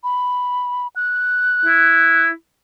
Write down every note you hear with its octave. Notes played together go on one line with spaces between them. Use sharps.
B5
F#6
E4